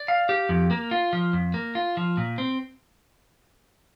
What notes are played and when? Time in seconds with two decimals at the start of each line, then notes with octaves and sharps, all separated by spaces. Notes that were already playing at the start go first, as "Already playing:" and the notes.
Already playing: D5
0.08 F5
0.29 G4
0.49 F2
0.71 A#3
0.91 F4
1.13 F3
1.33 F2
1.54 A#3
1.75 F4
1.97 F3
2.17 A#2
2.38 C4